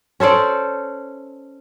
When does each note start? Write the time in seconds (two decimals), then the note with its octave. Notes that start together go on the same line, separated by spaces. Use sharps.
0.20 C#4 A4 C5 D5